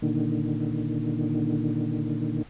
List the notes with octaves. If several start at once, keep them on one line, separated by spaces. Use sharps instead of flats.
A#2 D3 D#3